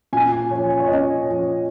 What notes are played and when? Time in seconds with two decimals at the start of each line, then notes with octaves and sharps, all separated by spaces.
0.13 A#2 G#5
0.51 F3 C#4
0.80 C#5
0.87 A#2 D#5
1.25 F3 C#4